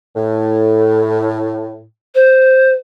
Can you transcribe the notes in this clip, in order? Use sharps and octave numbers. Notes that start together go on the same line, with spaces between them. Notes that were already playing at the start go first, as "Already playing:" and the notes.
A2
C5